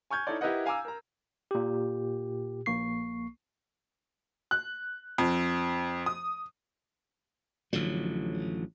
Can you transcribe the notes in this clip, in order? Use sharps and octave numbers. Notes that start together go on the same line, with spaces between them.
G#5 C#6 F6 G6 G#6
D#4 E4 A4 C#5 D5
E4 G4 A#4 B4 D#5 F#5
F5 G#5 A#5 D6 E6
A#4 A#5
A#2 G4
A#1 A#3 C#6 C7
F#6
F2
D#6
A1 D3 F3 F#3